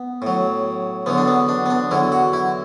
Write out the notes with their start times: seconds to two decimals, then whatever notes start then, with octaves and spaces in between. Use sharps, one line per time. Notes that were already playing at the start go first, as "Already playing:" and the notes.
Already playing: B3
0.22 A2 F#3
1.06 E2 D3 F#3 B3
1.18 D4
1.28 B3
1.48 D4
1.66 B3
1.70 D4
1.91 E2 D3 F#3 E4
2.12 F#4
2.33 E4